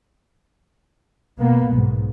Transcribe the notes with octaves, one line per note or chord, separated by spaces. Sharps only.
B2 A#3 B3
B1 G#2